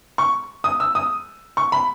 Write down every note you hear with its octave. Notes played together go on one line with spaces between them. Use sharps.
C#6
D#6
E6
D#6
C#6
B5